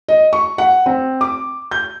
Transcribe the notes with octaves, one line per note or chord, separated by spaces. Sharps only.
D#5
C#6
F#5
C4
D6
G6